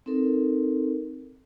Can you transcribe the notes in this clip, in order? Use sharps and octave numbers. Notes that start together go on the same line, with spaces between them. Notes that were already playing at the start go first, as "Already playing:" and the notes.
C4 D#4 A4 A#4